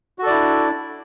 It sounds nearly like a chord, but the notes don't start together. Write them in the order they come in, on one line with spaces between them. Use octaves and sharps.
F#4 A4 D5 E4 D4